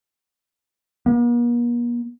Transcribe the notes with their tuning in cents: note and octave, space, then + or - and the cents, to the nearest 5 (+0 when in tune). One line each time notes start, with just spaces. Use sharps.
A#3 +45